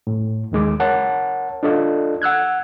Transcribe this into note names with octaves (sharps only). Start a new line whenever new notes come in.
A2
D#2 D#3 G#3 D6
A#4 C#5 F#5 A5
D4 F4 A4 D5 D#5
F#5 E6 F#6 G#6